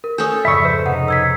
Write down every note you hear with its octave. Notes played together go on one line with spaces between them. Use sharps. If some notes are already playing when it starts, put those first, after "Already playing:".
A#4
C#4 A4 D#6 G6
F2 G#2 C#3 E5 B5 C#6 E6 C#7
B4 C5
C3 D#4 F#5
E6 G#6 B6